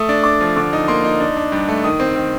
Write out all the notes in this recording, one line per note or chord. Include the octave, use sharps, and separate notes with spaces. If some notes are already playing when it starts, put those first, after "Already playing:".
Already playing: A3 D#6
D4
D4 D6
F3
D3 D6
D#4
A#3 C6
D#4
D4
D4
G2
A3
D#3 D#6
C4
D#3